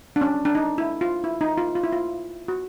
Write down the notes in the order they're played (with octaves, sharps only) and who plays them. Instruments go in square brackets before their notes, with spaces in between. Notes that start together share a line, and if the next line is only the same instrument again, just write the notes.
[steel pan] D4
C#4
D4
D#4
E4
F4
E4
D#4
F4
F4
E4
F4
F#4